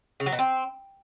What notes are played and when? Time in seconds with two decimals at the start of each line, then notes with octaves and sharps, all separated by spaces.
0.20 C#3
0.26 F#3
0.32 B2
0.39 C4